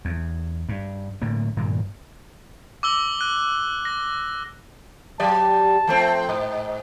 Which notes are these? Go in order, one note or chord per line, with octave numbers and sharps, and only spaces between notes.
E2
G2
A2 D3 A#3
G2 A#2 D#3 A#3
D6 E6 G7
F#6
A#6
F#3 G4 D5 A5
F3 A3 C4
G#2